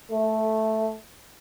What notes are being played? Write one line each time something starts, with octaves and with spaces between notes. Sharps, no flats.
A3